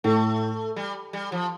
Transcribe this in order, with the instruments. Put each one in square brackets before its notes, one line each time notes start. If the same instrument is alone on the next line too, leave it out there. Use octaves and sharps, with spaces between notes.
[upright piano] A2 [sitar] A3
[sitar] G3
G3
F3